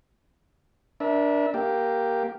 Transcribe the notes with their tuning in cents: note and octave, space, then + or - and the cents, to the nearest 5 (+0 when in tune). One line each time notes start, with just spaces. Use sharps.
D4 +0 A#4 +35 E5 -20
A#3 +0 G4 +0